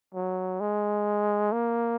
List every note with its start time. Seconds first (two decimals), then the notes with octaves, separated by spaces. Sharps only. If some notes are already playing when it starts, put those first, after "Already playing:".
0.15 F#3
0.61 G#3
1.53 A#3